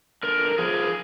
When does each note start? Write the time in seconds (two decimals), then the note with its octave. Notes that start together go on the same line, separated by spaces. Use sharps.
0.23 D3 A#4
0.58 F3 G#4